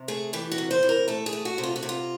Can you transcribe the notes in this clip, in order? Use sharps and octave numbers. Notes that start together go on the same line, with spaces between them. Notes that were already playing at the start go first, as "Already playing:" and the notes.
Already playing: C3
A3 G#4
E3 G4
F#4
C3
C5
E3
A#4
A3 A4
G#4
A3
F#4
C3
F4
F#4
C3
F4